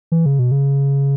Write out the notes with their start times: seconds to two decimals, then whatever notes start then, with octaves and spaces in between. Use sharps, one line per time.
0.12 E3
0.26 C#3
0.39 B2
0.52 C#3